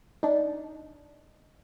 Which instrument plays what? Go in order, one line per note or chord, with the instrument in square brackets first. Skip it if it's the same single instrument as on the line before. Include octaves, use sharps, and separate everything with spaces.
[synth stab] D4 D#4